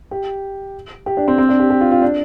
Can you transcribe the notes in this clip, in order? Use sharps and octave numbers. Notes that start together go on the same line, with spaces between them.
G4
G4
D4
C4
C4
D4
G4
G4
F4
F4
D4